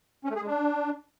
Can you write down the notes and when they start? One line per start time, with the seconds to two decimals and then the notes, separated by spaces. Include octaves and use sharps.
0.25 C#4
0.30 A3
0.36 G#4
0.42 G#3
0.47 D4